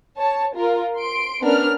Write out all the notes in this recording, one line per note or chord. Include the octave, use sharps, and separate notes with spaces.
C#5 A5
F4 A#4
C6 D7
B3 C#4 D4 A#4 D5 F6